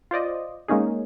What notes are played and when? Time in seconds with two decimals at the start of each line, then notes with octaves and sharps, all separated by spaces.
0.11 F4 C5 D5 D#5
0.68 G#3 A#3 C#4 D#4 G#4